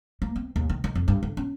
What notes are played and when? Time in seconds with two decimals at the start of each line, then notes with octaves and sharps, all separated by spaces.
0.22 A#3
0.36 C4
0.56 D#2
0.69 D#3
0.84 D#3
0.95 F2
1.08 G2
1.23 D3
1.37 C#4